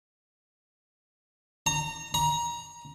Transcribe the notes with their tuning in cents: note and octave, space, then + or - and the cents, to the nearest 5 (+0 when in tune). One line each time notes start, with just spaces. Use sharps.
A#5 -20
A#5 +25